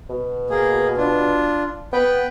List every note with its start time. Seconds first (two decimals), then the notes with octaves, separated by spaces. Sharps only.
0.09 B2
0.50 A#3 G#4
0.97 D4 F4
1.93 B3 B4 G5